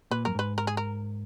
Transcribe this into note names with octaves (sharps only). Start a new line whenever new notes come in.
A#2 B4
F#2 A#4
G#2 B4
A#4
G#4
A#4